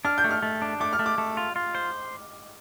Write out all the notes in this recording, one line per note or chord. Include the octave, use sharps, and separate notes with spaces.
D4 F6
G6
A3
F6
A3
D4
A3 D6
F6
A3
D6
A3
F4
F4
C5